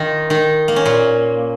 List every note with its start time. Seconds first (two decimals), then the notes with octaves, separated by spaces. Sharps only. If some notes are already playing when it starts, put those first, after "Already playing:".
Already playing: D#3 D#4 F4
0.30 D#3 D#4
0.68 A#3
0.76 C#4
0.85 A#2 A#3